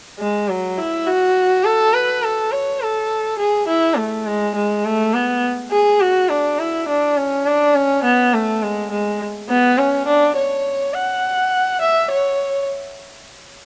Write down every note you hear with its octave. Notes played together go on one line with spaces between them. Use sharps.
G#3
F#3
E4
F#4
A4
B4
A4
C#5
A4
G#4
E4
A3
G#3
G#3
A3
B3
G#4
F#4
D4
E4
D4
C#4
D4
C#4
B3
A3
G#3
G#3
B3
C#4
D4
C#5
F#5
E5
C#5